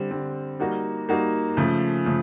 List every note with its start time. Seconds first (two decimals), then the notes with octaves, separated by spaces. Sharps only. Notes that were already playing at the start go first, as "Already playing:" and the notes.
Already playing: D3 G3 C4
0.11 D3 G3 C4
0.60 G3 A#3 D#4 F#4
1.09 G3 A#3 D#4 F#4
1.57 C#3 F3 A3
2.06 C#3 F3 A3